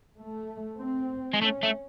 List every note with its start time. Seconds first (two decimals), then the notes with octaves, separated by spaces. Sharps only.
0.17 A3
0.79 C4
1.33 G#3
1.42 A3 C#4
1.63 A3